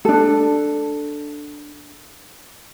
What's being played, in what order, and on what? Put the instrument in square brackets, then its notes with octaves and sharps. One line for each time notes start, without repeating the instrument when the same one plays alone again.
[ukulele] D4 A4